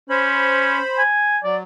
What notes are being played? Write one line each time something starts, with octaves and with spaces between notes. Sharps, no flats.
C#4 C5 B5
G#5
F#3 D5